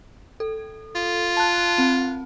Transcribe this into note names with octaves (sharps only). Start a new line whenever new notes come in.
A4
F4
A5 F#6
C4